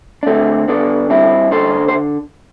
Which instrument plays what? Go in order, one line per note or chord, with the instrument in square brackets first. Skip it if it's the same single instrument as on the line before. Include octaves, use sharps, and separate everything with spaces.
[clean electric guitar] D4
D3 A3 C4
D3 B3 D4
G2 C4 E4
D3 A4 C5
C5